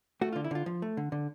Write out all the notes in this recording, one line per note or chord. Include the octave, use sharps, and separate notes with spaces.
A3 F#4
D3 F4
E4
D3 F4
F3
A3
D3
D3